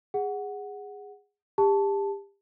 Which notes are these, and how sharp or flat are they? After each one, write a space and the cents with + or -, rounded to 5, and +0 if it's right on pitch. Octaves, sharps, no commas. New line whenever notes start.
G#4 -15 F#5 +0
G4 +30 A5 +0